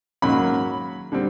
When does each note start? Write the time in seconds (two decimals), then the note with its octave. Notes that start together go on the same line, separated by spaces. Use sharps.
0.22 G#2 D#3 F#3 A#3 C#4 B5
1.12 D3 G3 C4